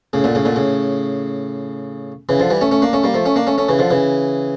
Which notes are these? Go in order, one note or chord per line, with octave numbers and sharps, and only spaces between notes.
A2 C#3
A#2 D3
A2 C#3
A#2 D3
A2 C#3
C#3 E3
D3 F3
E3 G3
A3 C#4
A3 C#4
A#3 D4
A3 C#4
G3 A#3
F3 A3
A3 C#4
A#3 D4
A3 C#4
A3 C#4
C#3 E3
D3 F3
C#3 E3